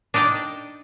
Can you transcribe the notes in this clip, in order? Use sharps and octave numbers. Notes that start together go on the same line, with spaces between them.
D4 D#4 D5 G5